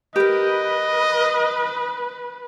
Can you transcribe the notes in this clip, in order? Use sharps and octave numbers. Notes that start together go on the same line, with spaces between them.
G4 A#4 B4 D#5